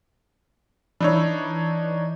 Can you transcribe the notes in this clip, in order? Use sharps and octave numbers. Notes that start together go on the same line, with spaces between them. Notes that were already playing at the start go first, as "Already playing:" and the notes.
E3 D4 D#4 C#5